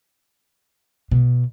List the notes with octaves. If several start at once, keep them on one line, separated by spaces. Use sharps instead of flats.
B2